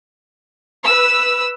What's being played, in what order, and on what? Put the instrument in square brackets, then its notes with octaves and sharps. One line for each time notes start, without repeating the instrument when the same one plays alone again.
[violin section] B4 E6